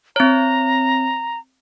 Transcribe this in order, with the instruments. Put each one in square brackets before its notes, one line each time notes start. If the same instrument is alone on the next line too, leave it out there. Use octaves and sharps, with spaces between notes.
[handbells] C4 C#5 [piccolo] A#5